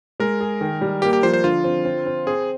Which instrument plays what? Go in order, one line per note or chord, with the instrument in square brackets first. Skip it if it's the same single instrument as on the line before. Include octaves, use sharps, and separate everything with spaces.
[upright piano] G#3 [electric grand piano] A#4
[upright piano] G#4
D#3
G3
[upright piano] A#3 [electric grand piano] G4
[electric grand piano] G4
[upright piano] F3 [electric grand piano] C5
[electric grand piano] C5
[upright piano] D3 [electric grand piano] F4
[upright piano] C4
C4
C4
[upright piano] C4 [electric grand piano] G#4